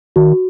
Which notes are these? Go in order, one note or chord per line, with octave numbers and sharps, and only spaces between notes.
D#3 F#4